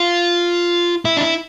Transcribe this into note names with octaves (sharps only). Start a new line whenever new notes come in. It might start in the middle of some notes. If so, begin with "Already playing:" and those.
Already playing: F4
E4
D4
E4